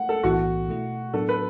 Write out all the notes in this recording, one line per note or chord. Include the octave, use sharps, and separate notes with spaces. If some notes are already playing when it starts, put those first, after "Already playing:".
Already playing: A3 F#5
A4
B1 A2 E3 B3 E4 F#4
B2 A3 E4
A2 F#3 B3 D4 A4
B4